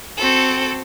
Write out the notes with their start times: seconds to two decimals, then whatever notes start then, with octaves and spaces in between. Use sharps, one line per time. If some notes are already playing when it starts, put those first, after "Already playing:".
0.17 C4 F#4 A4